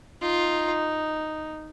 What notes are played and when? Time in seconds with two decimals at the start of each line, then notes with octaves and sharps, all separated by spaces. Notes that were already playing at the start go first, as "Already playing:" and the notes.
0.22 D#4 F4